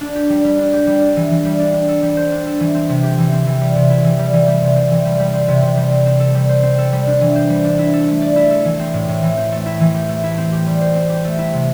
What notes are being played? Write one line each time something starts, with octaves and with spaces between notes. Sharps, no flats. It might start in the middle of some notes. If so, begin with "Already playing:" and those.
D4
G4
G3
G3
D4
G4
G3
D4
E3
E3
G3
D4
D4
A4
G3
C5
D4
A4
E3
C4
C3
G4
E3
C4
E3
G3
C3
E4
E3
G3
E3
G3
C3
C4
E3
G3
G3
C4
C3
C3
G3
C4
C4
A4
G3
C5
C4
A4
G3
D4
E3
C5
G3
D4
E4
A4
A3
D5
E4
A4
E3
C4
A2
A2
E3
C4
A3
E4
E3
G4
A3
E4
C4
G4
G3
C5
C4
G4
A3
E4
C3